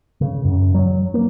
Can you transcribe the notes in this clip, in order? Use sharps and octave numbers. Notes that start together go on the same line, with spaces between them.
C#3
F#2
F#3
A#3